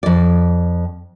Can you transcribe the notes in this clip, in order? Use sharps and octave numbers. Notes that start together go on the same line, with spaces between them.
F2 D5